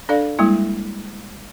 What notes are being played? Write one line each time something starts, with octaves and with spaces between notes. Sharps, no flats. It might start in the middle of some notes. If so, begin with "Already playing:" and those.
D4 A4 D5 F5
G3 G#3 A#3 E4